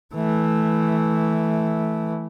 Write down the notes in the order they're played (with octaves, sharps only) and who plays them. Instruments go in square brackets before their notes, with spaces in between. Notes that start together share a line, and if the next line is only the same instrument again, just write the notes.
[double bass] E3 A3